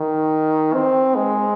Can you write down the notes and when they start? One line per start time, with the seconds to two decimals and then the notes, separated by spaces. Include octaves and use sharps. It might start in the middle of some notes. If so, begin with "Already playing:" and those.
Already playing: D#3
0.74 C4
1.16 G#3